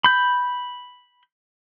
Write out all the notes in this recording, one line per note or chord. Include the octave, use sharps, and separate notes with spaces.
B5 G6